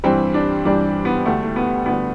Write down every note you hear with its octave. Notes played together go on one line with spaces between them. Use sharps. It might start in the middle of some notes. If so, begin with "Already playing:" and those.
G2 E3 G3 C4
D4
G2 E3 G3 D4
B3
D2 D3 G3 A3
A3
B3
D2 D3 G3 B3